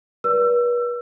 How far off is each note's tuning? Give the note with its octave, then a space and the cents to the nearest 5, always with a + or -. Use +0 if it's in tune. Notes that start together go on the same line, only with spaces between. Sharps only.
B4 -40 D5 -30 E6 +30